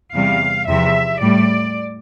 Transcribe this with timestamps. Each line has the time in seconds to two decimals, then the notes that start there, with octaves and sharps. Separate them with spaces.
0.13 E2 C3 G3 F5
0.66 E2 C3 F3 E5
1.20 A2 G3 D5